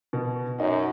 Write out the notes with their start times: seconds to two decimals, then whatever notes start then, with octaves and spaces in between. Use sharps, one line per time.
0.13 B2
0.60 F#2 D#4